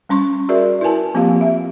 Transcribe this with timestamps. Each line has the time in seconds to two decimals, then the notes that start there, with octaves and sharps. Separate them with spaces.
0.09 G3 C#4 C6 C#6
0.49 F#4 G#4 A#4 D5 E5
0.81 E4 A#4 B4 G#5 A5
1.14 F3 A#3 C4 F4 G4 F5
1.41 E5